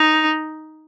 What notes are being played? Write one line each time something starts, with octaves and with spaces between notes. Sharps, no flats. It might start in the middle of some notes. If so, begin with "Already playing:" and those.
Already playing: D#4